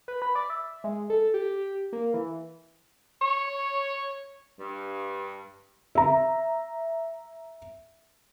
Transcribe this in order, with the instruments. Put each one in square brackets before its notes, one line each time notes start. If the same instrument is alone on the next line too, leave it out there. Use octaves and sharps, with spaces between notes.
[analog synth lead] B4
B5
D5
E5
G#3
A4
G4
A#3
E3
[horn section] C#5
G2
[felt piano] E5 A#5